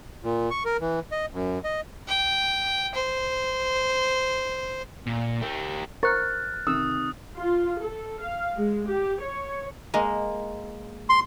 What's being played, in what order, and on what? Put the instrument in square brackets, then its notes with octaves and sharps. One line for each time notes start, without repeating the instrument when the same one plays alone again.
[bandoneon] A#2
C#6
A#4
E3
D#5
F#2
D#5
[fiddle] G5
C5
[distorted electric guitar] A#2
G4 A#4
[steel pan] A#4 C5 C#6 [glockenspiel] F6 F#6 A6
[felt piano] C3 D#3 [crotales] D#6 [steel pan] E6
[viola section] F4
A4
F5
G#3
G4
C#5
[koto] G#3 A#3
[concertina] C6